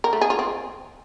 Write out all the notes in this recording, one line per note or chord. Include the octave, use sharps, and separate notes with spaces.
A#4
A3
G#4
F4
C4